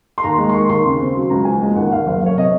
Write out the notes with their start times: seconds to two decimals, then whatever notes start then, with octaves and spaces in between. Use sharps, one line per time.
0.18 C6
0.24 D#2 A#5
0.38 G#3
0.49 C6
0.54 D#3 C#6
0.69 D#2 C6
0.85 C#3
1.00 C4
1.15 F#3 C6
1.30 C#2 A#5
1.45 F3 G#5
1.61 G#3
1.76 D#2 F#5
1.91 D#2 F5
2.07 F#1 F5
2.22 F#1 C#5
2.37 C3 D#5